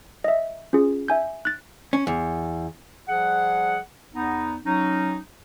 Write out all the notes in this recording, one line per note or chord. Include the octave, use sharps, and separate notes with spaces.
D#5 E5
C#4 F4 G#4
E5 G#5 G6
F#6 A6
C#4
E2
F3 G3 G#4 F#5
E2 B3 D#4
F#3 C#4 D#4